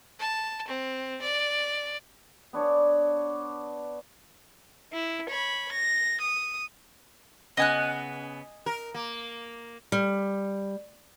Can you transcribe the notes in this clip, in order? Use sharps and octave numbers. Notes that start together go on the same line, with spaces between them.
A5
C4
D5
B3 D4 C#5 D5
E4
C#5 B5
A#6
D#6
C#3 B3 D#5 G#5 F#6
A#4
A#3
G3